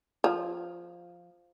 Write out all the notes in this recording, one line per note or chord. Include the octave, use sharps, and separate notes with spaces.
F3